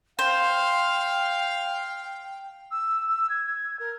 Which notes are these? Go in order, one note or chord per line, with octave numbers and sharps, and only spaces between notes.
C5 F5 G5
E6
E6
G#6
G#6
A#4